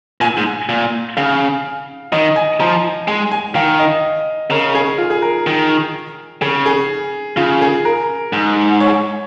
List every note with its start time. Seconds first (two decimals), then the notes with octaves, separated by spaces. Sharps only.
0.21 A#2 G#5
0.37 G#2
0.69 A#2
1.17 C#3 F5
2.12 D#3 D#5
2.36 G#5
2.60 F3 A#5
3.08 G#3 G#5
3.31 G#5
3.55 D#3 F5
3.79 D#5
4.51 C#3 A#4
4.75 G#4
4.98 F4
5.10 G#4
5.22 A#4
5.47 D#3
6.42 C#3 G#4
6.66 G#4
7.37 C#3 F4
7.61 G#4
7.85 A#4
8.33 G#2
8.80 C#5